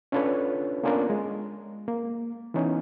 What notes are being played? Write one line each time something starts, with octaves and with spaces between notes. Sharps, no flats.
C#4 D4 F4 A4 B4 C#5
A#3 B3 C#4 D4 F4 A#4
G#3
A#3
E3 B3 C#4 D#4